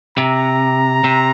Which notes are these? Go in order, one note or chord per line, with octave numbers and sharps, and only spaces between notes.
C3 A#5
C3